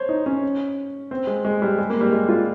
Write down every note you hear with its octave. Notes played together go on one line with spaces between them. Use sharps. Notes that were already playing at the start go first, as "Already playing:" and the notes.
Already playing: C5 C#5
D#4
C#4
C4
G#3
G#3
G3
G#3
A#3
G3
G#3
F4